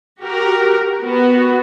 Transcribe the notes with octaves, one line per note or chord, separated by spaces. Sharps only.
F#4 G4 A#4
B3 F#4